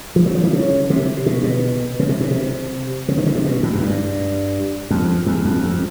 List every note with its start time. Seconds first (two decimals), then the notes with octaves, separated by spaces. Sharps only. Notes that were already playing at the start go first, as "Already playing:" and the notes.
0.16 F3
0.26 F#3
0.35 F3
0.44 E3
0.53 C#3
0.90 C3
1.26 B2
1.44 B2
1.99 C#3
2.09 C3
2.20 B2
2.31 C3
3.08 C#3
3.17 D#3
3.26 D3
3.35 C3
3.44 B2
3.63 A2
3.74 F#2
3.81 G2
4.90 F2
5.26 E2
5.45 F2
5.63 F2